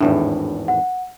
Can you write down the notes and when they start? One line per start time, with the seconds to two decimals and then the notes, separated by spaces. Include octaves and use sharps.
0.01 G#1 E2 A2 D4
0.68 F#5